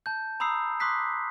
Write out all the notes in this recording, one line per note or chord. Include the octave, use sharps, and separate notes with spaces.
A5 G6
A#5 B5 D#6 E6 C7
C6 D6 D#6 F#6 B6 C7